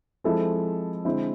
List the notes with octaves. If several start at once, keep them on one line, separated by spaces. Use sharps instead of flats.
F3 G#3 C4 E4 A4
D3 G#3 C4 E4